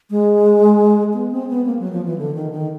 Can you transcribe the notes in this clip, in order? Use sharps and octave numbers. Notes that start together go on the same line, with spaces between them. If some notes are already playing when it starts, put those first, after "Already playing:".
G#3
B3
C4
B3
A#3
F#3
F3
E3
D3
D#3
D#3